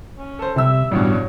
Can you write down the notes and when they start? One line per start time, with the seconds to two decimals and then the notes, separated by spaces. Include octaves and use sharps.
0.18 C#4
0.39 A4 C5
0.56 C3 G3 E5 E6
0.91 A1 G2 B2 G3 C#5